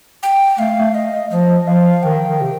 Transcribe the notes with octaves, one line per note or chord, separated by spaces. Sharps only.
G5
A3 F5
A3
D#5
F3 D#5
F3 F5
D#3 G5
D#3
C3